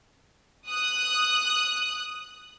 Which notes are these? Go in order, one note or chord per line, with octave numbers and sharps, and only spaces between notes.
D#6 F#6